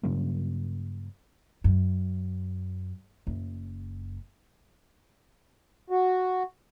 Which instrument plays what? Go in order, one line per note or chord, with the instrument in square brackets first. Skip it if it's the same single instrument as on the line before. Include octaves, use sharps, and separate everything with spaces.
[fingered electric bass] G2 C#3 F#3 A#3
[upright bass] F#2
F#1
[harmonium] F#4